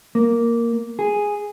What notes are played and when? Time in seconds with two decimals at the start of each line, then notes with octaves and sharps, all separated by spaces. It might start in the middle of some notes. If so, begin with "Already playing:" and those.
0.15 A#3
0.99 G#4